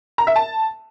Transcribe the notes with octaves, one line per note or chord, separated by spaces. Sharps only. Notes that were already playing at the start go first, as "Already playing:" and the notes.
A#5
E5
A5